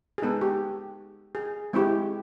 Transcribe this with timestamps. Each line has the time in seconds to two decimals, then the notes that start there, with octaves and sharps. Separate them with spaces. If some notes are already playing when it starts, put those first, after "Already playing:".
0.18 G#4
0.22 G#3 B3 D#4 A4
0.41 G4
1.35 G#4
1.73 G#3 C4 E4 G4